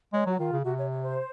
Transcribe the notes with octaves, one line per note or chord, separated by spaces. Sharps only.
G#3 C#5
F#3 F#4
D#3 F4
C#3
C3 F#4
C#5
C#5
C5